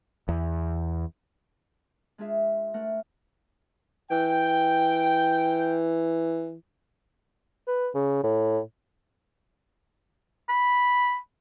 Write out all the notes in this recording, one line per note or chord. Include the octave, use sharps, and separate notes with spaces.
E2
G#3 D4 F4 G#4 E5
A3 D4 A#4 F#5
E3 G5
B4
C#3
A2
B5